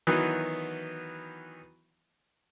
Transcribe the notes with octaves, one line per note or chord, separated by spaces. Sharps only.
D#3 E3 F#3 B3 D#4